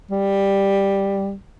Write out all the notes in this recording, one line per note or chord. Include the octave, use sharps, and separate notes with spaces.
G3